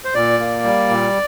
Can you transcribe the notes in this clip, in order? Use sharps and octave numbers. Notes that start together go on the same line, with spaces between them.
C5
A#2 D5
A#3
G3
A#2